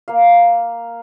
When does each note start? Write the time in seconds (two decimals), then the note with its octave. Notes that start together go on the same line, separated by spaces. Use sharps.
0.08 A#3 F5